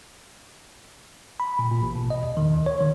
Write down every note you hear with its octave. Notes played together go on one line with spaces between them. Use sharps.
B5
A#2
A#2
A1
B2
D#5
E2
D#3
D2
C#5
D#3